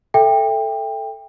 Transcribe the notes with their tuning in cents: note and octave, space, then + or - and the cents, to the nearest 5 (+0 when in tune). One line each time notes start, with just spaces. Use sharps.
A4 +0 E5 +0 G5 +20